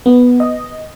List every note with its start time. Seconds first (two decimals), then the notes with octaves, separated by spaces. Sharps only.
0.06 B3
0.40 D#5